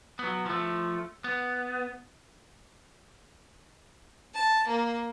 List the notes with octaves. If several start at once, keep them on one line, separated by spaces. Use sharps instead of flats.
F#3 B3
F3 A3
B3
A5
A#3